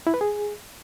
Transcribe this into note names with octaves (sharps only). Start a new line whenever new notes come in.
E4
B4
G#4